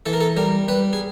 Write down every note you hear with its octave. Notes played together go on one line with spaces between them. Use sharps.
E3 A4
A#4
A4
G3 A#4
G3 B4
G#4